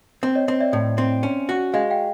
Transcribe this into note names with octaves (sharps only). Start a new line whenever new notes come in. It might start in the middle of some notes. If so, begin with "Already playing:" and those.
C4
C#5 D#5
C4
D5 E5
A2
C4
C#4
F#4
G#3 D#5 F5
F5 G5